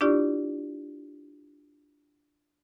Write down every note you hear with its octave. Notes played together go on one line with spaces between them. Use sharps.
D4 E4 F4 G4 D5 C#6